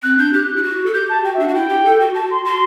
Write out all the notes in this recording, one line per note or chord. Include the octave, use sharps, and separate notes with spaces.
C4 F#6
D4 G6
G4 F#6
E4
F#4
A4
G4 G6
A5
F#4 G5
E5
D4 F#5
F#4
E4 G5
G4
A4
F#4
F#4 A5
C6
F#4 C6